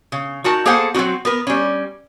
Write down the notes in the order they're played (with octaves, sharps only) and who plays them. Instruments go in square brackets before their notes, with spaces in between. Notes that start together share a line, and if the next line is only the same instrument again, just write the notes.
[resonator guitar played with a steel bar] C#3
D#4 F#4 A#4 A5
A#3 G#4 A4 C5 F#5
F#3 C4 C#4 D#4 F#4
B3 A#4 B4
G3 C#4